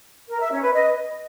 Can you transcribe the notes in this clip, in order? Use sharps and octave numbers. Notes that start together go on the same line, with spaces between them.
A#4
E5
C#4
B4
D#5